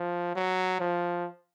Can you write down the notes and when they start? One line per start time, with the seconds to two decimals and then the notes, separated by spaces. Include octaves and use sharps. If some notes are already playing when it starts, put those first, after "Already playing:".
Already playing: F3
0.36 F#3
0.80 F3